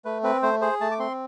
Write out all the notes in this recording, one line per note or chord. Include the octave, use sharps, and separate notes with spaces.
A3 B4
C4 B4
A3 C5
G#4 C5
A3 A5
D6
C4 C6